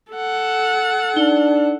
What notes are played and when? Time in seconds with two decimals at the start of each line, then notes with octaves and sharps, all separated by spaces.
0.12 A4 F#5
1.16 D4 D#4 G7